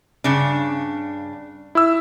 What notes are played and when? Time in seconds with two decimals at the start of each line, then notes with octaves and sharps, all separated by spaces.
0.24 G2 C#3 D4
1.75 E4 E6